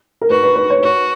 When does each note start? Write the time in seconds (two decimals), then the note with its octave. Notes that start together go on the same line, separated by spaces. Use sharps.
0.21 A#4
0.30 F#4 B4
0.43 B4
0.56 B4
0.70 C#5
0.82 F#4 B4